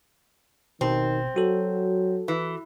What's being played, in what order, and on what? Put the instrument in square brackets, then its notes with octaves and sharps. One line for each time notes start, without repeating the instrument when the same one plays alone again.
[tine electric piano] G#1 B2 [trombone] D#3 [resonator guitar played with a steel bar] C4
[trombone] F#3 [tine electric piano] F#4 A4
[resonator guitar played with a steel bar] E3